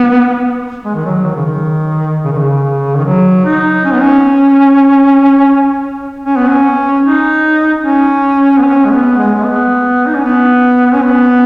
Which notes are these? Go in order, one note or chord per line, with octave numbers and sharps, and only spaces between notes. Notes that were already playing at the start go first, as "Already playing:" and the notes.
Already playing: B3
G#3
D#3
F#3
D#3
C#3
D#3
C#3
D#3
C#3
D#3
F#3
D#4
C#4
B3
C#4
C#4
B3
C#4
D#4
C#4
B3
C#4
G#3
B3
G#3
G#3
B3
D#4
C#4
B3
C#4
B3